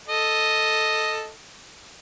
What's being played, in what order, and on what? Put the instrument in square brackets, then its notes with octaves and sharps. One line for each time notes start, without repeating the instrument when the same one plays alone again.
[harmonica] A4 D#5